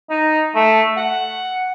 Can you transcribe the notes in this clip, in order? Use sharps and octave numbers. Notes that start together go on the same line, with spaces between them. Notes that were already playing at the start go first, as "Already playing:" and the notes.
D#4
A3
F#5